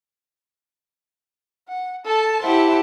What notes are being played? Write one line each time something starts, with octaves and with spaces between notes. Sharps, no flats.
F#5
A4 A5
E4 G4 C5 E5 F#5 A5